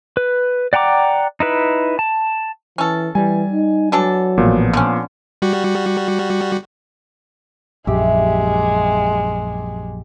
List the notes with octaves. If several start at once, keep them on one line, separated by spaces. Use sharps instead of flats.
B4
D5 F#5 G5 A#5 D6
D#4 E4 B4
A5
E3 C#4 A4
E3 G3 G#5
D#4
E3 F#3 D4 A4
A1 A#2 F3 B3
D3 C#4
G3 F#4
A#1 F#2 G#3 G4 E5